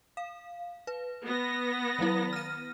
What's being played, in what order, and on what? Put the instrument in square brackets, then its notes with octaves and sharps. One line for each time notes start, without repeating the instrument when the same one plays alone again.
[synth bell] F5
B4
[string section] B3 A#6
[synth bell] D#3 F#3 E4
F6 D#7